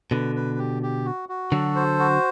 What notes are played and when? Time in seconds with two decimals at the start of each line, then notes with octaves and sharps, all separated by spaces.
0.11 B2 D3 B4
0.36 B4
0.58 G4
0.83 G4
1.05 F#4
1.29 F#4
1.52 D3 F#3 A4
1.76 C5
1.99 F#4